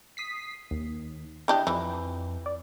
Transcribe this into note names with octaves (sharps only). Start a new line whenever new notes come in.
D#6 B6 C7
D#2
E3 D4 G4 D5 D#5 G6
F2 E3
D5